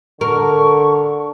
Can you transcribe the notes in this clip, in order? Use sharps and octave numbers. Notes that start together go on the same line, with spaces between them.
D3 A#4 C#6